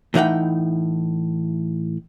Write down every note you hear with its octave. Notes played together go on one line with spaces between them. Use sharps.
A2 E3 D#4 F#5 G5